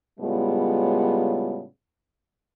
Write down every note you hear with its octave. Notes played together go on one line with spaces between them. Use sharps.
A2 C#3 G3 G#3 B3 F4